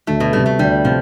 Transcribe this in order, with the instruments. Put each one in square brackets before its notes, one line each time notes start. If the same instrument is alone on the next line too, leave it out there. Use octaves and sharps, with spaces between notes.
[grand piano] D2 [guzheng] A3
[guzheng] B2
[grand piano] C3 G3 [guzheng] A3
[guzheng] A3
[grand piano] D2 [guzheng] G3
[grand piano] C3 [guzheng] F3